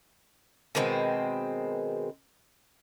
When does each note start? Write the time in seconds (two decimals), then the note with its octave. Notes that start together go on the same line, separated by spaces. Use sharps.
0.75 B2 D#3 G#3 C4